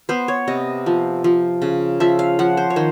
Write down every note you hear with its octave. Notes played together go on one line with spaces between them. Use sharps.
B3 C5
C#5
C3 D#5
F3
F3
C#3
F3 E5
F5
F3 F#5
C5
C#5
D#3 C5